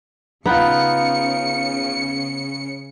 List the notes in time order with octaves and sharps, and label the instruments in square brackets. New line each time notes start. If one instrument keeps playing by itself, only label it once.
[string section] C#3 C#7 [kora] B3 G5 [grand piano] D#4 F4